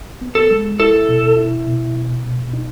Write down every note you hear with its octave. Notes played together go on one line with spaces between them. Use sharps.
B3
A4
G#3
E4 A4
B2
E4
B2
B2
B2
D#4